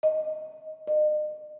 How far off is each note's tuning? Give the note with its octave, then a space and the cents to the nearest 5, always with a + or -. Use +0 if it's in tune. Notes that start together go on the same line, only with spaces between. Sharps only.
D#5 +10
D#5 -40